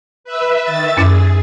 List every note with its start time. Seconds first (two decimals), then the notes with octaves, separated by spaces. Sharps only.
0.24 B4 E5
0.64 D#3 E5 A6
0.97 F#2 C#4 E4 G#4